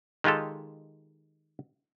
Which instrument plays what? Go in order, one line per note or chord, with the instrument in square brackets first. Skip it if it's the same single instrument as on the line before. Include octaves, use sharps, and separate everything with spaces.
[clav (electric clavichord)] D#3 G#3 F4 G4 A4